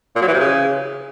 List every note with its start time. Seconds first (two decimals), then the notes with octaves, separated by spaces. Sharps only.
0.16 A#2
0.22 F#3
0.28 E3
0.34 C3
0.39 C#3